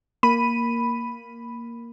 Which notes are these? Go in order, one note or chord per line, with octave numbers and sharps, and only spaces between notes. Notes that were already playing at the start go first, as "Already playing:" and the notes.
A#3 B5 D#7